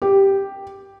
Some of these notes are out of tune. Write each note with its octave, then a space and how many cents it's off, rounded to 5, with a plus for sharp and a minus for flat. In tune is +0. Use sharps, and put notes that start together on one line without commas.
G4 +0